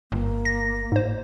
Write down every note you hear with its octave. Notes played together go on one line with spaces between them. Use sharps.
G1 A#3
A#6
G#2 C5